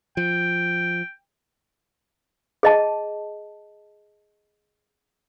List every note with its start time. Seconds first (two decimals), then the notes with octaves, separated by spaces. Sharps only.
0.17 F3 G5
2.63 G#4 D#5 A5